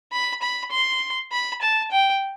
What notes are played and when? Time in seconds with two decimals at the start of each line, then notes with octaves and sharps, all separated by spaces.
0.12 B5
0.42 B5
0.71 C6
1.32 B5
1.61 A5
1.91 G5